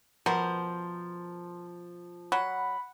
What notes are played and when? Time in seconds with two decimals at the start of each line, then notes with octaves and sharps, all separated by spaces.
0.26 B2 F3 A#4 C5
2.32 F#3 F#5 B5